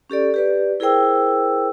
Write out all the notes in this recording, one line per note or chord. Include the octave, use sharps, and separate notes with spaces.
C#4 G4 A4 D5
G4 B4 D5
E4 G#4 A#4 C5 G5 E6